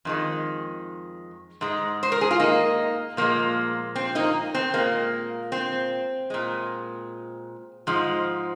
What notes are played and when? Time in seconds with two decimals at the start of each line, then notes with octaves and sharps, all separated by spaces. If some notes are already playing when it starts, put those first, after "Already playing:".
0.05 F2 D#3 G#3
1.61 G#2 G#3
2.03 C5
2.12 A#4
2.21 G#4
2.31 F4
2.40 A#3 D#4
3.17 A#2 F3 G#3 A#3
3.96 C4
4.15 A#3 D#4
4.55 C4
4.74 A#2 G#3 A#3
5.52 C4
6.30 A#2 G#3
7.87 G#2 F3 G#3